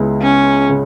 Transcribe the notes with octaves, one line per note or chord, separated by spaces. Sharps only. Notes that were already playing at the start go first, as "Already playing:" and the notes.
Already playing: C#2 C#3 G#3 B3 E4
C#4
C#3